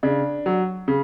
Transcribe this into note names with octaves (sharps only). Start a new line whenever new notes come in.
C#3 D4
F#3
C#3